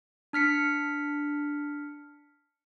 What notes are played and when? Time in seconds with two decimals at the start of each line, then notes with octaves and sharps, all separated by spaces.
0.33 D4 F6 B6 C#7